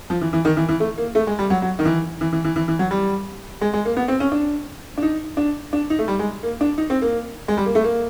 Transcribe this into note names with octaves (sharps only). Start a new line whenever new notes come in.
F3
E3
E3
D#3
E3
E3
A3
A#3
A3
G#3
G3
F#3
F#3
D#3
E3
E3
E3
E3
E3
E3
F#3
G3
G#3
G#3
A#3
B3
C4
C#4
D4
D4
D#4
D4
D4
D#4
A3
G3
G#3
A#3
D4
D#4
C4
A#3
G#3
G3
A#3
A3
A#3